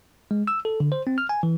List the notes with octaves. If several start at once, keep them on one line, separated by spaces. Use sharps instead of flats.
G#3
E6
A4
D3
C5
C4
F6
G#5
E3